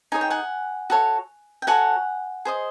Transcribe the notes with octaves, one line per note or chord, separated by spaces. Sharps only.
D#4 G#4 C#5 G#5
G5
F#5 G#5
F#4 A4 C#5
G5
F#4 A4 C#5 F#5 G#5
G#4 C5 D#5